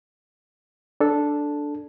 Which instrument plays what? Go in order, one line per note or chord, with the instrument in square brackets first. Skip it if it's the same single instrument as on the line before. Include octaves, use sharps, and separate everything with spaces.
[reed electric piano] D4 A4